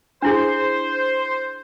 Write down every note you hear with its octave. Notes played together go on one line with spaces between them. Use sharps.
D4 E4 G#4 C5